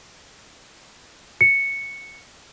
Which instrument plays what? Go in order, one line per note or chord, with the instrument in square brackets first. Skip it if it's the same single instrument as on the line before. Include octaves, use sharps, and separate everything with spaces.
[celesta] C#7